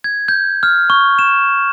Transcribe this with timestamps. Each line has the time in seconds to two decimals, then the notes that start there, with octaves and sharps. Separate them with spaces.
0.04 G#6
0.28 G6
0.63 F6
0.90 C#6
1.19 E7